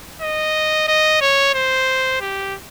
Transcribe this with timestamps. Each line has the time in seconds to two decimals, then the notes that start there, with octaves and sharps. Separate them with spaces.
0.22 D#5
0.88 D#5
1.22 C#5
1.55 C5
2.21 G4